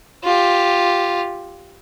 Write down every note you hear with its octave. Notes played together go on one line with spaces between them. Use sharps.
F4 G4